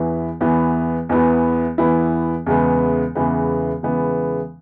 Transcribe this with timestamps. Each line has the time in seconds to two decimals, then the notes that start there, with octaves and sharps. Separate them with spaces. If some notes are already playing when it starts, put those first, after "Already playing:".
Already playing: E2 E3 B3 E4
0.41 E2 E3 B3 E4
1.09 E2 E3 B3 E4
1.78 E2 E3 B3 E4
2.46 E2 C#3 E3 G#3 B3
3.15 E2 C#3 E3 G#3 B3
3.83 E2 C#3 E3 G#3 B3